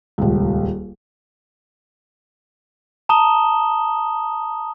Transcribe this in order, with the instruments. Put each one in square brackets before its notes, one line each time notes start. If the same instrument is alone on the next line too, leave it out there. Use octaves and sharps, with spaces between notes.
[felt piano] D#1 C#2
[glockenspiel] A5 A#5 D#6 E7 G7